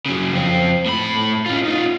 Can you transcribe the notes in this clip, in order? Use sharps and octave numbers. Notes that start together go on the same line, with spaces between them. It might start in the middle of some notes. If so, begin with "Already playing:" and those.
C#3 F#3
F2 C4
A2 B5
C#4 F4
D#4 F4